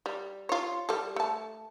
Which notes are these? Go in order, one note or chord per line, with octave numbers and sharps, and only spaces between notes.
G3
F4 C#5
G3 A4
A3 A5